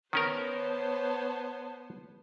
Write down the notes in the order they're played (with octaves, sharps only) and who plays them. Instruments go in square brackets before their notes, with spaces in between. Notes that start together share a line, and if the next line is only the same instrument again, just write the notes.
[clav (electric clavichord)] D#3 C#4 A#4 [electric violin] B3 C5 [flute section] C#5 A5